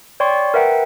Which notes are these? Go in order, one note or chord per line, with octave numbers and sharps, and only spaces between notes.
C#5 D5 G5 C6 C#6
A#4 B4 E5 F#5 G5 A#5